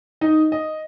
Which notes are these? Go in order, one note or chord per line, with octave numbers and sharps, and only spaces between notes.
D#4 D#5
D#5